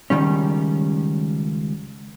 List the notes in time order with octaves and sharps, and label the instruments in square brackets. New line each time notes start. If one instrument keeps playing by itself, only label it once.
[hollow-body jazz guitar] C#2 F#2 D#3 G3 C#4